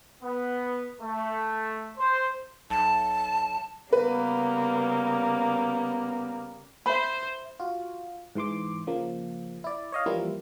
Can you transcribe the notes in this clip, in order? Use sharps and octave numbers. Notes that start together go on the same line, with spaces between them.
B3
A3
C5
B1 A5
C#3 G3 A#3 B3 B4
C5 E5 B5
F4 F#4
G#2 E3 C6 D6
C#3 F3 A#3
E4 D5
C#5 D#5 F5
E3 F3 G3 A#3 E4 F4